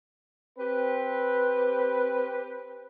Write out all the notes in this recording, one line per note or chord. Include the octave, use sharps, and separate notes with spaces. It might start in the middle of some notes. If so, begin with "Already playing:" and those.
C4 G4 B4